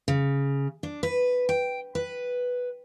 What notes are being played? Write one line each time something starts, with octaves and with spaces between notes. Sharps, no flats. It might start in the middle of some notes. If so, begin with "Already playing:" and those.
C#3
D4
B4
G5
B4